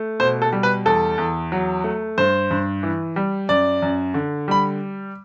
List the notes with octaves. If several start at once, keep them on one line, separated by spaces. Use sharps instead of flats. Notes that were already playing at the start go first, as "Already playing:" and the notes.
Already playing: A3
B2 C5
A4
G3
B4
E2 A4
E2
F#3
A3
G2 C5
G2
E3
G3
F#2 D5
F#2
D3
G3 B5